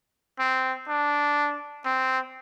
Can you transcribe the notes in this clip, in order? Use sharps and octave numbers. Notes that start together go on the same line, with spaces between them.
C4
D4
C4